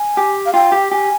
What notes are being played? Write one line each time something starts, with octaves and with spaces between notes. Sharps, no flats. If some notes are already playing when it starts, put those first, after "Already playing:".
Already playing: G#5
G4
F5
F4 G5
G4
G4 G#5